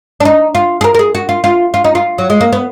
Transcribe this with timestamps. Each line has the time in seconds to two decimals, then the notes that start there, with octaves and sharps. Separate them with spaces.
0.20 D4
0.25 D#4
0.55 F4
0.81 G#4
0.84 A#4
0.95 A#4
0.99 G#4
1.15 F#4
1.29 F4
1.44 F4
1.74 F4
1.84 D#4
1.95 F4
2.18 F#3
2.30 G#3
2.41 A#3
2.53 B3